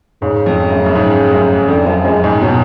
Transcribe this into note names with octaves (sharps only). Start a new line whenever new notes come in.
G#2 C#3
F2
F#2
F#2
G#2
F#2
F2 D3
F#2 F3
F#2 G#3
G#2 G#3
B2 F#3